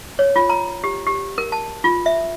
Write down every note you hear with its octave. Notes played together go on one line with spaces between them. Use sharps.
C#5
F4
A#5
G4
G4
A#4
A5
F4
E5